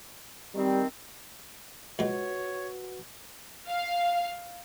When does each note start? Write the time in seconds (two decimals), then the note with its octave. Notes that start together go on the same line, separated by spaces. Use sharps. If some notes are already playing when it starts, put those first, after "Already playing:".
0.55 D#3 G3 C4
1.99 C#2 G#3 F#4 B4 C#5 F#5
3.68 F5